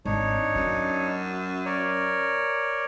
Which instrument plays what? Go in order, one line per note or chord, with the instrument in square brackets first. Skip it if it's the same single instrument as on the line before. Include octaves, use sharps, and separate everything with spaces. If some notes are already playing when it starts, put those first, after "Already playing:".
[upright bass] G#1 [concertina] D4 D#4 C#5
[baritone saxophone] F#2 [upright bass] A#3 C#4
[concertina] A#4 C#5 D5